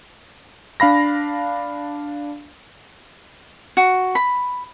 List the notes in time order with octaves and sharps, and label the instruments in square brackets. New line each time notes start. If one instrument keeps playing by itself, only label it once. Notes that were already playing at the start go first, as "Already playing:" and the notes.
[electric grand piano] D4 F5 B5 A#6
[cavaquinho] F#4
B5